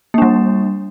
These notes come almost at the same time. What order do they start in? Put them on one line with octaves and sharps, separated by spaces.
A#3 D4 G3